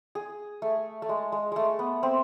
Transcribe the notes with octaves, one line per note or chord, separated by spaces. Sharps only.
G#4
A3
A3
G#3
G#3
G#3 A3
B3
C4